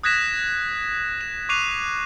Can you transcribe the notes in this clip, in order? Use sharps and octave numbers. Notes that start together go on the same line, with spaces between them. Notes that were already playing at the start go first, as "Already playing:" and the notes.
D#6 F#6 G#6 A#6 B6 E7
E7
C#6 D6 F#6 C7 D#7 F7